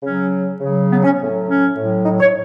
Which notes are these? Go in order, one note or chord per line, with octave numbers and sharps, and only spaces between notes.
C#3 F#3 C#4
C#3 F#3
B3
C#4
A2 F#3
C#4
A2 F#3
D#4
C#5